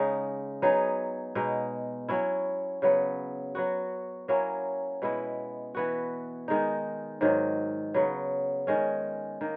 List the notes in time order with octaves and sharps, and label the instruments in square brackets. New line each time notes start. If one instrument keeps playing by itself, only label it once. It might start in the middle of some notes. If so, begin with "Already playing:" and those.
Already playing: [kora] C#3 G#3 D#4
F#3 B3 D#4 G#4
B2 G#3 D#4
F#3 C#4 E4
C#3 F#3 B3
F#3 B3 F#4
F#3 A#3 C#4 E4
B2 G#3 B3 E4
E3 B3 F#4
D#3 G#3 D#4
G#2 D#3 F#3
C#3 F#3 B3
D#3 G#3 C#4
D#3 A#3